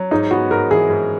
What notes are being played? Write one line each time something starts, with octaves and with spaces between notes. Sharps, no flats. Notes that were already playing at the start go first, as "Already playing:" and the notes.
Already playing: F#3
G#2 D#4
B3 F#4
G#2 A#4
E3 G#4
G#2